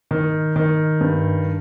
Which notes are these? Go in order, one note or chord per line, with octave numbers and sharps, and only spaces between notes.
D#3
D#3
G2